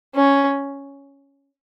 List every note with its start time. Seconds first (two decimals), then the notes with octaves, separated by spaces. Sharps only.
0.15 C#4